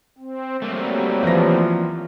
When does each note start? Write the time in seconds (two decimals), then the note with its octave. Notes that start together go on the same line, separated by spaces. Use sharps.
0.18 C4
0.62 F#3 G3 A3 A#3 C4
1.23 E3 F3 A#6